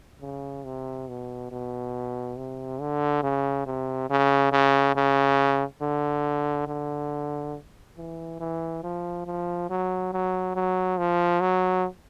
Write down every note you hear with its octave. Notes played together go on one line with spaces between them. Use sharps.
C#3
C3
B2
B2
C3
D3
C#3
C3
C#3
C#3
C#3
D3
D3
E3
E3
F3
F3
F#3
F#3
F#3
F3
F#3